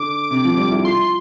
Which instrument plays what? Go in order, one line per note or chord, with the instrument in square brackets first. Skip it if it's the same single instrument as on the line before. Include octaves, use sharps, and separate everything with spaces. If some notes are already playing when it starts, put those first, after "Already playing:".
Already playing: [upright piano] D3 [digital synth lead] D6
[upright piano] C3
F3
G3
E4
[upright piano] F4 [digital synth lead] C6